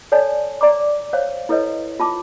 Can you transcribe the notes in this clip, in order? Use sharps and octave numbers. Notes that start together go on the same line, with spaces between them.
A4 C#5 D5 G#5 A5
D5 A#5 D6
C5 C#5 F5
E4 A4 B4 C#5 D#5
F4 A5 D6